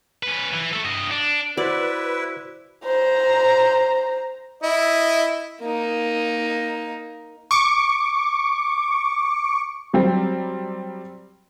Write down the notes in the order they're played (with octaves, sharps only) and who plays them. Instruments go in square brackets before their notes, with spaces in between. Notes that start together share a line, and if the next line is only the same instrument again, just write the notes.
[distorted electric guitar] C#4 B4
E3
A3 A4
G2 D#5
D4
[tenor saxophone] E4 [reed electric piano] F#4 C5 [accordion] B4 [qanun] D5
[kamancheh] C5 A#5
[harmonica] E4 D#5
[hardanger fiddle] A#3 D#4
[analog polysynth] C#6 D6
[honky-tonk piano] F#3 G3 C4